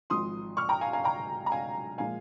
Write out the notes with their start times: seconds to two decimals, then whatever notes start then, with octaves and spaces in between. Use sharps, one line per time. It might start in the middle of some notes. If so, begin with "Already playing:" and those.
0.10 G#1 G#2 F3 C6 D#6
0.57 C#6 F6
0.69 G5 A#5
0.81 F5 G#5
0.93 F5 G#5
1.04 G5 A#5
1.46 A#5
1.52 F5 G#5
1.98 A#2 F3 G#3 F5 G#5